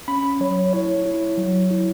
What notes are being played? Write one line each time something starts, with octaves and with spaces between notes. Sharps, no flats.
C#4 B5
F#3 C#5
E4 C#5
E4
F#3
E4